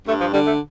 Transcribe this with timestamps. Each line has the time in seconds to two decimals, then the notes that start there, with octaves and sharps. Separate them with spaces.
0.06 G2 A3
0.19 F3
0.32 D3 G3
0.45 A3